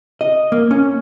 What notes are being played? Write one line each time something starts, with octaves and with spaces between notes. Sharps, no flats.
D#5
A#3
C#4